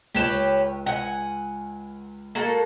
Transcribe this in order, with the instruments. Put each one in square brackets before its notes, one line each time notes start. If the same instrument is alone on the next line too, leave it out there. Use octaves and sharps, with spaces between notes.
[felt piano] C#2 E7 [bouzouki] G4 B4 C#5
[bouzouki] F#5 G#5
A#3 F#4 A4